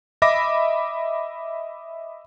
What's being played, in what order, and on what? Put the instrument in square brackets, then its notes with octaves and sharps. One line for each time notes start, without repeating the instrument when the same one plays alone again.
[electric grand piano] D#5 E5 B5 D6 A#6